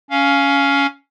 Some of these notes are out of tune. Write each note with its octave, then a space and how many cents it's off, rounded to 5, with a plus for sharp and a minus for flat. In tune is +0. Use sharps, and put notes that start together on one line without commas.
C#4 +10 F5 +0